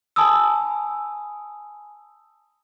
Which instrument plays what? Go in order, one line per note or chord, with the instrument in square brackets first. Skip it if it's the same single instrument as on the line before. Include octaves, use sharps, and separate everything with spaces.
[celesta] G#5 A5 B5 D#6 E6